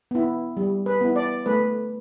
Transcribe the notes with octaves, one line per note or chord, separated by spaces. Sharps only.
B3 E4
G3
B4
B3 E4
D5
A3 B4